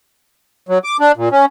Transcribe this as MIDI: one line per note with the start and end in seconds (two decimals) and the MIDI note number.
0.69 0.78 54
0.84 0.97 86
1.00 1.12 62
1.17 1.29 46
1.32 1.45 61